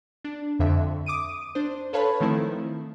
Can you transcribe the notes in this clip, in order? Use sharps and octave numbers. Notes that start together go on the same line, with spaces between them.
D4
F2 D3 E5
D6 D#6 D7 D#7
D4 C5
A4 B4 C#5 F5 A5 B5
D#3 F3 A3 C4 E4